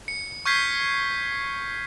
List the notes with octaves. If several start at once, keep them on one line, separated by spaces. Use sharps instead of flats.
C#7
C#6 F6 G6 G#6 B6 C7